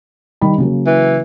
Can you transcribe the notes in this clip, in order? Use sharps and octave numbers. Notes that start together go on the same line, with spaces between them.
D#3 G3 B5
C#3 F#3 A#3
E3